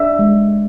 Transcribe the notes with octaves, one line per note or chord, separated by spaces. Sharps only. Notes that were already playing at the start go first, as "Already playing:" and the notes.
Already playing: D4 E5
G#3